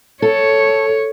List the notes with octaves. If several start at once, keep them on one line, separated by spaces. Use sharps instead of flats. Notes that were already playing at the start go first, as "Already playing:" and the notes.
A4 C#5